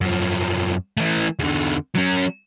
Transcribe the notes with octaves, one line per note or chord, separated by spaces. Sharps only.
F#2 F3
E3 A3
E2 D3
F#3 C#4